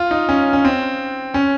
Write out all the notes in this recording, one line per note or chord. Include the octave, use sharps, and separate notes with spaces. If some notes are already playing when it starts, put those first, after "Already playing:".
Already playing: F4
D#4
C#4
C#4
C4
C#4